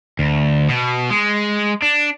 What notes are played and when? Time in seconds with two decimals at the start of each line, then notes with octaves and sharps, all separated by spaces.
0.19 D2
0.69 B2
1.10 G#3
1.82 D4